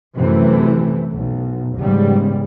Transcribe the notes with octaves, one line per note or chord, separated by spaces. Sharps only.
F#2 C3 E3 A3
B1
E2 G#2 C#3 G3